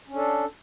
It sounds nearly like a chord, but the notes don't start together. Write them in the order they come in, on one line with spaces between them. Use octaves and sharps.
C#4 D4 A4